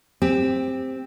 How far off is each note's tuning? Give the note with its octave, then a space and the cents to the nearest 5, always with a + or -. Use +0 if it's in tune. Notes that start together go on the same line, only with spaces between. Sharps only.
C4 +0 G4 +20